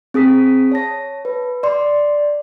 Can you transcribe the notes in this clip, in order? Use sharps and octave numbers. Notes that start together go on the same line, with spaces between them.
C4 G#4 D#6 B6
C#5 A5 A#6
B4
D5 C6